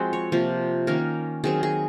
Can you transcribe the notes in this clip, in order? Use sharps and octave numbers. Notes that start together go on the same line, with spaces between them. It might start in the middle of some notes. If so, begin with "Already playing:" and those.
Already playing: F3 G#3 C4 F#4
C#5
C3 F3 A#3
D#3 A#3 C#4 A#4
D#3 F#3 C4 G#4
G#4